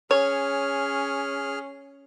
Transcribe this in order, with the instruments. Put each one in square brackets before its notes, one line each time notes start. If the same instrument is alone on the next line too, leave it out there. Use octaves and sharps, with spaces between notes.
[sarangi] C#4 [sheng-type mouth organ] G#4 F6 [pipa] C#5